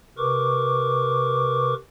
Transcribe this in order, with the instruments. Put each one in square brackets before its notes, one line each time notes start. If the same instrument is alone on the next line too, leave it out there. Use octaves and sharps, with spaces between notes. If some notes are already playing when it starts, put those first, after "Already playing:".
[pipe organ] C3 A#4 B4 C#6 D6